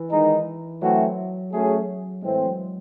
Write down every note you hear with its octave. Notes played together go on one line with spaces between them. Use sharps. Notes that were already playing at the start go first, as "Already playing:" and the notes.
Already playing: E3
D#3 G#3 D#4
E3 F#3 A3 C4 F#4
F#3 A3 C#4 G#4
A2 E3 G#3 C4
F#3